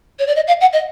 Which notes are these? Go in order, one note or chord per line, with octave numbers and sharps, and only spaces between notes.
C#5
D5
D#5
F5
F#5
D#5